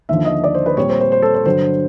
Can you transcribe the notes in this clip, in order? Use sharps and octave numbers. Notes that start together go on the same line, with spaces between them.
D#2 D3 F3 E5
D#5
D5
C5
B4
A#2 G3 C4 C#5
C5
C5
C5
A4
C5
G2 D3 F#3 C5